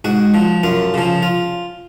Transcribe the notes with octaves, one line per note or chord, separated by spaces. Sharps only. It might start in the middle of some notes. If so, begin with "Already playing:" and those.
G#2 F#4
F3
F#2 F4
C#3 F3
F4